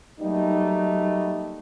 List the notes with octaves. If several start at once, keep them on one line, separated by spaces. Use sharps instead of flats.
F#3 G3 A3 A#3 D#4